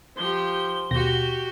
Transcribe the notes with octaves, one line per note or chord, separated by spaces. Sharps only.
F3 G4 C5 G7
D#2 B2 F#4 G4 A#6